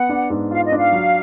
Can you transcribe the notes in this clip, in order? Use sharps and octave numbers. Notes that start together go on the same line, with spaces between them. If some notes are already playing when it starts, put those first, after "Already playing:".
Already playing: B3 F#5
D4
G#2
F4 F5
D#5
D4
F5
F#3